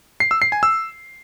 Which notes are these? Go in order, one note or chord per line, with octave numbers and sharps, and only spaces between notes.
C7
E6
C7
G#5
E6